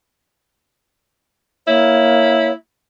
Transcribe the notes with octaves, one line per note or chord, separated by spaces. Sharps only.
A#3 E4 C#5